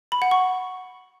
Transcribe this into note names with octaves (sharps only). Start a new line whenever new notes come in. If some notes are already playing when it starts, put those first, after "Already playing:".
B5
F#5
C#6